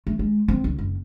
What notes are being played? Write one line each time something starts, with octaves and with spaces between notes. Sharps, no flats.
A3
G#3
C4
C#2
F#1